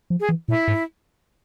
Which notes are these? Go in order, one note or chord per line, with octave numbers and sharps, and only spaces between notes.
F3
G#4
E3
A#2 E4
G#2